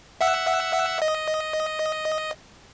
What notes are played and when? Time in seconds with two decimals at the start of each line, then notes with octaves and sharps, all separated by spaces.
0.21 E5 F#5 E6
1.02 D#5